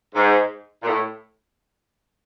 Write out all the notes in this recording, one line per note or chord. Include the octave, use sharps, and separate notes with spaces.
G#2
A#2
A2